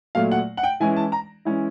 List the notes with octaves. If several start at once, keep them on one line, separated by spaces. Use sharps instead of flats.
A#2 F#3 A3 F5
F#5
F#5
G5
E3 G#3 C#4 E4 G#5
A5
A#5
E3 G#3 C#4 E4